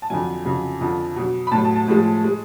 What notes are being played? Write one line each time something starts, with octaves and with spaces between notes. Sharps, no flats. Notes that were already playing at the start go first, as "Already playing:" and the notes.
A5
F2 D3 F#3 G#5
F2 C#3 F#3
F2 D3 F3
B2 F#3
B5
A2 F#3 A5
A5
A5
A2 F3 G#3
G#3